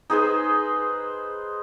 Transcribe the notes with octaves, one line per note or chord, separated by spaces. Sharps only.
D#4 G#4 B4 C5